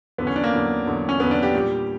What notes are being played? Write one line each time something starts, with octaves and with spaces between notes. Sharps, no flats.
E2 D3 F#3 B3
C#4
D4
A#3
E2 D3 F#3
E2 D3 F#3
C#4
E2 D3 F#3 B3
D4
G4
A#2 G3